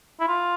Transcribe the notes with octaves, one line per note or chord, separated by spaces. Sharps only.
E4
F4